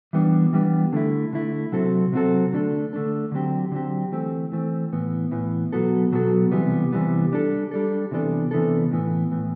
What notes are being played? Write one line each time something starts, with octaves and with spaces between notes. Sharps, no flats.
E3 G3 B3 D4
E3 G3 B3 D4
D3 A3 E4
D3 A3 E4
C3 F#3 C4 F#4 A4
C3 F#3 C4 F#4 A4
D3 A3 D4 A4
D3 A3 D4 A4
D3 F#3 C4 G4
D3 F#3 C4 G4
E3 A3 C4
E3 A3 C4
A2 E3 B3
A2 E3 B3
B2 F#3 B3 F#4 A4
B2 F#3 B3 F#4 A4
C3 E3 G3 B3
C3 E3 G3 B3
G3 D4 A4
G3 D4 A4
C3 E3 B3 D4 A4
C3 E3 B3 D4 A4
A2 E3 B3
A2 E3 B3